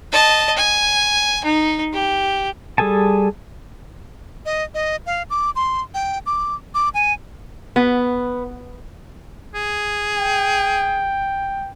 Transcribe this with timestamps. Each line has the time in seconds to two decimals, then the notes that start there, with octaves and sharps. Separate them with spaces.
0.12 D#5 A5
0.57 G#5
1.44 D#4
1.93 G4
2.78 G3 G#4 A4 G#5 A5
4.46 D#5
4.74 D#5
5.06 F5
5.30 D6
5.56 C6
5.94 G5
6.26 D6
6.74 D6
6.94 G#5
7.76 B3
9.54 G#4
10.18 G5